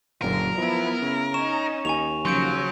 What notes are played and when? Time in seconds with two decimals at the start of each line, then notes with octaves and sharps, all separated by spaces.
0.22 F#1 F#2 A#2 D3 A#4
0.57 F3 B3 E4
1.02 C#3
1.34 C#4 D#4 C#6 E7
1.85 D#2 G#5 C#6 F7
2.25 C#3 F3 F#3 C6 G6 D7